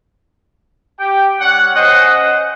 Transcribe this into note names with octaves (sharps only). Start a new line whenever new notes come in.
G4 G5
G3 C#4 F#5
C#4 C5 D#5 F#5